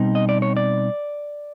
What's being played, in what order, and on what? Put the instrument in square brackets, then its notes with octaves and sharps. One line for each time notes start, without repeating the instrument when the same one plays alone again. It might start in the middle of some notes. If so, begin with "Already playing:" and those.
Already playing: [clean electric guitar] B2 G3 C4 D#4
D#5
D5
C#5
D5